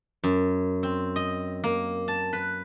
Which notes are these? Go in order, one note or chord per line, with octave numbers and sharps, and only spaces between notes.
F#2
C4
D#5
A#3
A5
B4